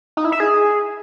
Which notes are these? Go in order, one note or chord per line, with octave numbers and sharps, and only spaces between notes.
D#4
E4
E5
G#4